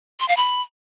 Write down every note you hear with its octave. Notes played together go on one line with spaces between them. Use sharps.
C6
F5
B5